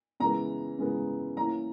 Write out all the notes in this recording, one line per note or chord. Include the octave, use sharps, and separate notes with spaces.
C#3 E3 G#3 B3 A#5
C#3 E3 G#3 B3
E3 A#3 C#4 E4 A#5